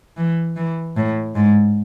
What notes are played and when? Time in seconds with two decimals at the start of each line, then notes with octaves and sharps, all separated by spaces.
0.17 E3
0.56 E3
0.96 A2
1.36 G#2